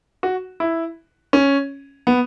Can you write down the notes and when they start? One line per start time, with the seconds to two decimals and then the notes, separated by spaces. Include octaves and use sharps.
0.23 F#4
0.60 E4
1.33 C#4
2.07 B3